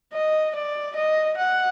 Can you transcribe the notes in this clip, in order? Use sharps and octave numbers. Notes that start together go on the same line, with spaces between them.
D#5
D5
D#5
F#5